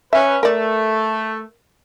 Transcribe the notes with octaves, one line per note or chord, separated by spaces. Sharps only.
C#4 B4 E5
A3 A#4 D5